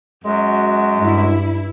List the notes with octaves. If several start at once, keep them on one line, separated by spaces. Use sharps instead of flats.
F#2 G#3 F#4
G2 E4